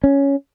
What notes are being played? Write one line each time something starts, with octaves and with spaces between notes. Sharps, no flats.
C#4